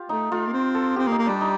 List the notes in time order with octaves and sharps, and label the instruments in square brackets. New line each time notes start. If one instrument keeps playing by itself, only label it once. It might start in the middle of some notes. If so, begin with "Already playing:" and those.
Already playing: [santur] F4 G4
[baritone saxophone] A3 [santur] D#4
[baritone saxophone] A3 [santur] F4
[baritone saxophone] A#3
C4
[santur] A4
[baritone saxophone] C4 [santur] G4
[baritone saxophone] A#3
[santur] D#4
[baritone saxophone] A#3
[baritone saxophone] G3 [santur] D4
[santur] D#4